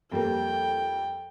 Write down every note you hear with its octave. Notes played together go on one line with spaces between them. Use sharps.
F2 G3 A#3 G5